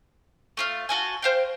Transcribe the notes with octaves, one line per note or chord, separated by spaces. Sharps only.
A3 F4 F5
F#4 A4 G#5
C5 F5 G5